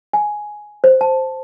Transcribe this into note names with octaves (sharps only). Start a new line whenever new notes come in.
G#5
C5
A5